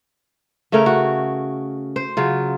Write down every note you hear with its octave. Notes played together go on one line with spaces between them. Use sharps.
C#3 A3 C#4 A#4
F#4
C5
C#3 F#3 F4